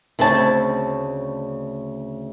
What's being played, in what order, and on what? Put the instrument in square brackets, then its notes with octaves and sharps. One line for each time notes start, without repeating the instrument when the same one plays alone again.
[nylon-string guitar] D2 C#3 C4 C#5 A5